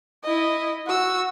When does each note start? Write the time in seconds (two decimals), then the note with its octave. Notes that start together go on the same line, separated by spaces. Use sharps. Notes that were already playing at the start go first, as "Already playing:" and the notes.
0.24 E4 D#5
0.87 F#4 E6